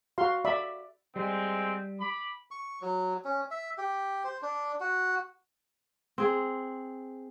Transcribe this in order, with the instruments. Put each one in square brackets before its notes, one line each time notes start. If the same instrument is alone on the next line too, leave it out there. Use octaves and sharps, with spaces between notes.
[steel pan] F#4 F5 C6
D5 E5 B5
[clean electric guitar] G3 [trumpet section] G#3 C4
[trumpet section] B5 D6
[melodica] C#6
F#3
C#4
E5
G4
C5
D4
F#4
[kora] C4 G#4